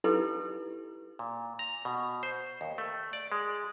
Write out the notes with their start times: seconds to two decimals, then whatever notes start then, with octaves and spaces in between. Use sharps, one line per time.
0.04 D#4 E4 G4 A4 B4
1.19 A#2
1.59 A#5
1.85 B2
2.23 C5
2.61 D#2
2.78 A3
3.13 D5
3.32 G#3